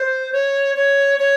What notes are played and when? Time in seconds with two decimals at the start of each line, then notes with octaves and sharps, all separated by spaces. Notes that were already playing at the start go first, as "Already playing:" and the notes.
Already playing: C5
0.32 C#5
0.76 C#5
1.18 C#5